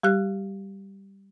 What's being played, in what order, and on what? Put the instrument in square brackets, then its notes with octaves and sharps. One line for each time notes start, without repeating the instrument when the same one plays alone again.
[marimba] G3 G4 F#6